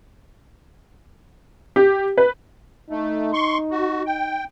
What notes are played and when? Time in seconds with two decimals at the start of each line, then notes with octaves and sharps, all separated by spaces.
1.76 G4
2.18 B4
2.90 A3 D#4
3.33 C6 C#6
3.71 F#4
4.06 G5